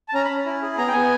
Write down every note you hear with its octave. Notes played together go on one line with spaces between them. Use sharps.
A5
C#4 A#5
B5
C#4
E4
G#4
B3 A#5
G5
B3 G#5